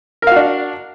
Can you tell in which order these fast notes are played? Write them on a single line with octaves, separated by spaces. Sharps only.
A#4 F5 F#4 D4